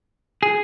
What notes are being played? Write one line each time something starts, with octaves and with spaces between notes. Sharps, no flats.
G#4